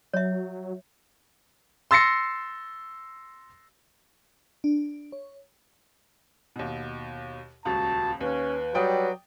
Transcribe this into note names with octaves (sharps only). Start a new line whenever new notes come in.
F#3 C#5 E5
C6 E6 A6 A#6 C7 C#7
D4
C#5
D#2 B2
D#1 C#2 F#4 A5
D#2 C#4 B4
F#3 G3 D5 G5 D#6